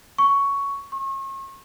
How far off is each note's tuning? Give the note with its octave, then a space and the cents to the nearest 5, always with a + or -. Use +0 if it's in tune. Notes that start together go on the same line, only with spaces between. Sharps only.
C#6 +10
C#6 -40